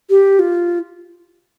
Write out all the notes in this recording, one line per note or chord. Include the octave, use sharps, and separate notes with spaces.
G4
F4